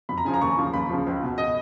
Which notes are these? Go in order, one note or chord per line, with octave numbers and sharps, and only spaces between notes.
F2 B5
A#5
C#3 F3 G#5
A#5
D#2 C#6
C#3 F3
D#2 B5
C#3 F3
C#2
B2
D#5